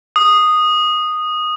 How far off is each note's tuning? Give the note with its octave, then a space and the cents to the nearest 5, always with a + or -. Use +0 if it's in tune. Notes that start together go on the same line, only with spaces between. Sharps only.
D#6 -10